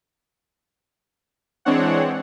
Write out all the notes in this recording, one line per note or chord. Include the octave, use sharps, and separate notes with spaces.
E3 G#3 C4 D4 C#5 F#5